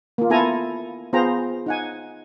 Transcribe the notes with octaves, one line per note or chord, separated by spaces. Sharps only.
A#3 F4
B3 E4 F4 A4 G#5 A#5
B3 F4 G#4 C5 G5 A#5
D#4 F#5 G#5